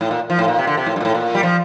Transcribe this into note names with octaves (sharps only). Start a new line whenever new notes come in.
A2
A#2
F3
A2
A#2
C3
D3
C3
A2
G2
A#2
A2
A#2
G3
F3